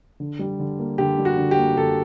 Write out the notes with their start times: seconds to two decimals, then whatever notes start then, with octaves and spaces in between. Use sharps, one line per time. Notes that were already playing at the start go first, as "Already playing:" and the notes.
0.20 D3
0.39 G3
0.60 D3
0.79 A#3
0.98 D3 G4
1.18 G3
1.25 F#4
1.37 D3
1.51 G4
1.58 A#3
1.76 D3 A4